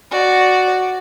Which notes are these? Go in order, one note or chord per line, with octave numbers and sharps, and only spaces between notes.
F#4 D5